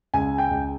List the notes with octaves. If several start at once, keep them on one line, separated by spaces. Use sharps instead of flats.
C#2 G#5
G5
C#2